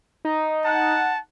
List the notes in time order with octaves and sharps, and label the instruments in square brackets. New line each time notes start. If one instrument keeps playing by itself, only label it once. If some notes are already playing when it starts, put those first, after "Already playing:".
[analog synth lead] D#4
[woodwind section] F#5 [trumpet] A5